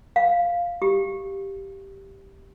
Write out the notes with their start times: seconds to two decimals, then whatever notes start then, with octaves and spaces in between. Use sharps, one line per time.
0.16 F5
0.82 G4